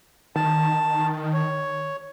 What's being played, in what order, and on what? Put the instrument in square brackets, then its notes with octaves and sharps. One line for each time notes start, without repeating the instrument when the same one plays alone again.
[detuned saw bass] D#3 [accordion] A5
[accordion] C#5